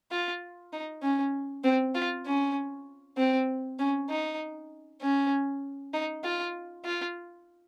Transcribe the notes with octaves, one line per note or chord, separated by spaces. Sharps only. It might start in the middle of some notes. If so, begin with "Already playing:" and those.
F4
D#4
C#4
C4
F4
C#4
C4
C#4
D#4
C#4
D#4
F4
F4